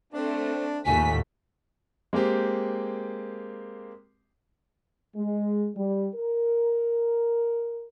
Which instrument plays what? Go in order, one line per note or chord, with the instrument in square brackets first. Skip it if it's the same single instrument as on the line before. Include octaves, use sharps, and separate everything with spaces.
[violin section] A3 C4 [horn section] D4
[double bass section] D#2 A2 [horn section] F3 D#4 F#4 [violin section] A3 B6 [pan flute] G#5
[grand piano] G#3 A#3 C4 G4
[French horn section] G#3
G3
A#4